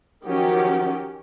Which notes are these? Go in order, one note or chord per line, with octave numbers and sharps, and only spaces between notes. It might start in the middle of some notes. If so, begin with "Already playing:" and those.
D#3 F3 F#3 C#4 F#4 G4